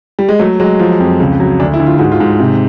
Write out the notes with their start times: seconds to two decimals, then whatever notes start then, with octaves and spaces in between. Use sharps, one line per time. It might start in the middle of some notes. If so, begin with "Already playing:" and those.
0.19 G3
0.29 G#3
0.39 F#3 A3
0.60 F#3 G#3
0.79 F3
1.00 F2
1.20 C#2
1.40 F#3
1.60 D2 D4
1.74 E4
1.80 D2
1.86 F4
1.98 G#2 F#4
2.12 F4
2.20 G#2
2.40 C3